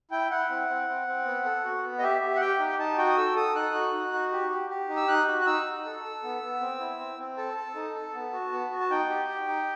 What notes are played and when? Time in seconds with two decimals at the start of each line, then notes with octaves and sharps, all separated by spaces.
0.11 E4 G5
0.31 E4 F#5
0.50 C4
0.69 C4
0.88 C4
1.08 C4
1.25 B3
1.45 A4
1.64 F#4
1.83 B3
1.99 D#5
2.02 G4 E5
2.21 G4
2.36 F#5
2.40 G4 G5
2.59 D#4
2.78 D#4 A5
2.98 F#4 G5
3.09 D#6
3.17 A4 E6
3.36 A4 D#6
3.55 D#4 F#6
3.74 F#4
3.93 D#4
4.13 F#4
4.32 G4
4.50 G4
4.70 G4
4.89 D#4
4.96 E6
5.08 D#4 F#6
5.28 F#4
5.41 F#6
5.46 D#4 E6
5.66 D#4
5.85 A4
6.04 A4
6.23 B3
6.42 B3
6.60 C4
6.80 E4
6.99 C4
7.19 C4
7.37 A4 A5
7.57 A4
7.75 D#4
7.95 A4
8.14 B3
8.33 F#4
8.52 B3
8.71 F#4
8.80 A5
8.90 D#4 G5
9.09 G4
9.28 G4
9.48 D#4